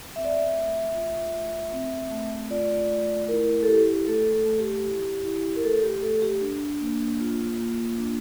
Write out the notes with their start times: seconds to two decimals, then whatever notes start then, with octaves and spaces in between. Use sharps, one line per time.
0.15 C4 E5
0.25 D5
0.34 E5
0.55 A3
0.94 F4
1.33 A3
1.72 C4
2.11 A3
2.50 F4 D5
2.89 A3
3.28 E4 A#4
3.63 A4
3.68 E4 G4
4.07 A3 A4
4.33 A4
4.46 A3
4.59 G4
4.85 E4
5.23 E4
5.56 A#4
5.63 A3 A4
5.83 G4
6.02 A3 A4
6.22 G4
6.41 D4
6.81 A#3
7.20 F4
7.59 A#3
7.98 D4